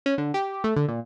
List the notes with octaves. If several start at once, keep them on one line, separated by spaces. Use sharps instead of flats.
C#4
D3
G4
A3
D3
A#2